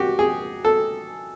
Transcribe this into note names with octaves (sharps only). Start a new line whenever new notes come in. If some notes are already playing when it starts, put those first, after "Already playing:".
Already playing: F#4 G4
G#4
A4